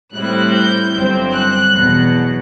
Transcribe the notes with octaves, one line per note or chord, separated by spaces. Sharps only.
A2 G3 C4 E4 F#6
G6
G1 G2 F#3 C4
F#6
E2 B2 F#3